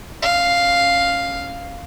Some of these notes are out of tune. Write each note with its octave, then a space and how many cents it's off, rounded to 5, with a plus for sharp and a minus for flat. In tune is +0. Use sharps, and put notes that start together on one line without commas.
C#4 +0 F5 +0